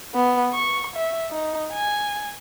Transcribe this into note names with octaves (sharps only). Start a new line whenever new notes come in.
B3
C#6
E5
D#4
G#5